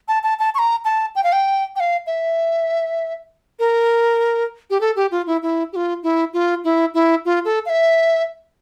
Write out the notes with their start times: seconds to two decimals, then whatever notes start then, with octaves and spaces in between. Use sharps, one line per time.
0.08 A5
0.23 A5
0.39 A5
0.55 C#6
0.59 A#5
0.85 A5
1.16 G5
1.24 F5
1.33 G5
1.76 G5
1.80 F5
2.07 E5
3.59 A#4
4.70 G4
4.81 A4
4.96 G4
5.11 F4
5.27 E4
5.42 E4
5.73 G4
5.76 F4
6.03 E4
6.33 F4
6.64 E4
6.94 E4
7.25 F4
7.45 A4
7.66 F5
7.69 E5